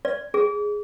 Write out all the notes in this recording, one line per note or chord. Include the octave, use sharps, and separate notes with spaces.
D5
G#4